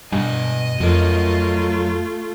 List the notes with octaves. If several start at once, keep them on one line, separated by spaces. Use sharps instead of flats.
G2 B2 D#5 G#5
F2 F#3 A3 F4 A#4